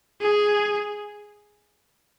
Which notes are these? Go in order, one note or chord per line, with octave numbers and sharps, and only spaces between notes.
G#4